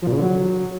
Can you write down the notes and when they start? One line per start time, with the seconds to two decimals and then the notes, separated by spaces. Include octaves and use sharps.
0.02 F3
0.07 A#2
0.12 C#3
0.17 D3
0.22 F#3